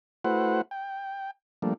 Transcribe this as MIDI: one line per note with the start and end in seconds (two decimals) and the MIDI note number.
0.25 0.61 57
0.25 0.61 64
0.25 0.61 66
0.25 0.61 71
0.25 0.61 72
0.25 0.61 78
0.71 1.31 79
1.62 1.74 53
1.62 1.74 55
1.62 1.74 57
1.62 1.74 58
1.62 1.74 62